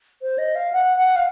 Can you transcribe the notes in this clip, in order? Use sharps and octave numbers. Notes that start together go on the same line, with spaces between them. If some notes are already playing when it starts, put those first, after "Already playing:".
C5
D#5
F5
F#5
F#5
F5